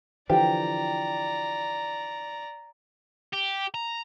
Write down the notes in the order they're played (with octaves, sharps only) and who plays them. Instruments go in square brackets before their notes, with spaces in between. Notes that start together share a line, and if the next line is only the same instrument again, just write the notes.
[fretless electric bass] D3 E3 F3 [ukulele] G4 G5 [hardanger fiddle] D5 A#5
[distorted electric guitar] G4
A#5